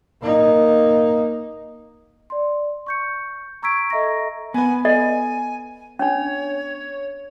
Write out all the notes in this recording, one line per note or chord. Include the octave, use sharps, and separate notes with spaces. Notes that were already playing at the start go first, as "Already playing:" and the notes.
A#3 D#4
D5 C6
C#6 G6 C#7
A#5 C#6 E6 G#6 B6 D7
A4 D#5 E5 A#5 C#6 A#6
B3 B4 G#5
A4 D5 D#5 G#5
C#4 D4 C#5